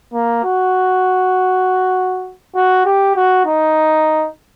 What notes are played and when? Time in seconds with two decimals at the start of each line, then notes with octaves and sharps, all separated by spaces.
0.14 A#3
0.44 F#4
2.55 F#4
2.86 G4
3.16 F#4
3.46 D#4